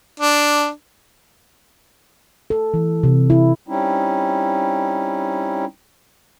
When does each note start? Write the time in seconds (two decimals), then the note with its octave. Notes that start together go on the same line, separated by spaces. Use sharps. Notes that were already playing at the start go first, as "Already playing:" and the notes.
0.20 D4
2.50 A4
2.74 E3
3.03 C3
3.30 E4
3.68 G3 C4 C#4 D#4 E4